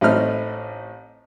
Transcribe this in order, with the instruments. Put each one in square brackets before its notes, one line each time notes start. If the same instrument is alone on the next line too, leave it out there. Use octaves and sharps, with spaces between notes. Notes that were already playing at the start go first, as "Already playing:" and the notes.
[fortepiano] A1 A2 A3 C4 D#4 F6